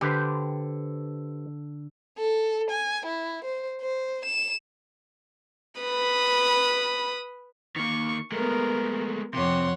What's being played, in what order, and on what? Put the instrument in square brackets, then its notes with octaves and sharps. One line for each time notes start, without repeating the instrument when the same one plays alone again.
[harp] D3 [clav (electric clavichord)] G4 B4 C5
[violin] A4
G#5
E4
C5
C5
E7
[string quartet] B4 B5 D#6
[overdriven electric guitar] D#3 A#3 [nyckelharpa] C#6
[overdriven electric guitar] G#3 A3 [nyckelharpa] B3 A#4
[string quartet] F2 C#5 F#5 [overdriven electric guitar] C3 [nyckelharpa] C6